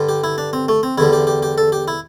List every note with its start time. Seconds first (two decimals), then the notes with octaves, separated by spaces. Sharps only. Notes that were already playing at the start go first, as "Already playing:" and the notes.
Already playing: G2 D3 G3
0.09 G4
0.24 E4
0.38 D4
0.53 C4
0.68 A3
0.83 C4
0.98 E2 D3 G3 E4
1.13 G4
1.27 G4
1.43 G4
1.58 A4
1.72 G4
1.88 E4